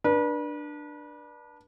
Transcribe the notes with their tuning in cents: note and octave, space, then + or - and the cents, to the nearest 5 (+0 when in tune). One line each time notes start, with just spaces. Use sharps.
D4 +15 B4 -35